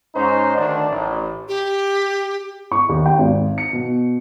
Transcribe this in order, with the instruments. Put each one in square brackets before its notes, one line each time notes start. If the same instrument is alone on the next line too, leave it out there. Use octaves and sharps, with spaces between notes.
[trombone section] G#2 C#4 D#4 C5
D2 D#3 D4
A1
[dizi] G4
[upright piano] C#6
D#2
G5
G#1
C#7
B2